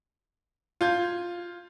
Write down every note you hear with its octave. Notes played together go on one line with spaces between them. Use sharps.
F4 G6 G#6